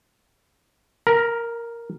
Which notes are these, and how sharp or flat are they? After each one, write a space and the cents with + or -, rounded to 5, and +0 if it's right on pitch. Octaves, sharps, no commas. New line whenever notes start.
A#4 +0 A#5 +45